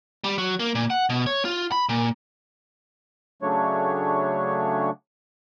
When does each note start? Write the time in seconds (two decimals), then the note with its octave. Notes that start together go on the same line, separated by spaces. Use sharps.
0.24 G3
0.38 F#3
0.59 A#3
0.75 A#2
0.90 F#5
1.10 B2
1.26 C#5
1.45 F4
1.72 B5
1.89 A#2
3.42 C#3 F#3 A3 D4 C#5